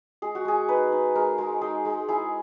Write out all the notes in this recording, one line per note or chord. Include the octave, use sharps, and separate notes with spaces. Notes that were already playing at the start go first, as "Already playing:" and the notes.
G#3 G#4
F#4
G#3 G#4
D#4 B4
D#4
G#3 A#4
G#3
D#4 G#4
G#3
E4 G#4